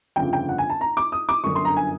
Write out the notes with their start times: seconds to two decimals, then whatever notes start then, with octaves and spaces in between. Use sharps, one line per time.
0.16 G1 F2 C#3 G5
0.33 G5
0.49 F#5
0.58 G#5
0.70 A5
0.81 A#5
0.97 D6
1.12 D#6
1.29 D6
1.44 G1 F#2 D3 C#6
1.55 C6
1.65 A#5
1.77 G#5